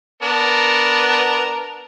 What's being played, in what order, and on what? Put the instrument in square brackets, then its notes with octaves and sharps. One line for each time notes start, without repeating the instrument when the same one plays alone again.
[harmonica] B3 D4 A#4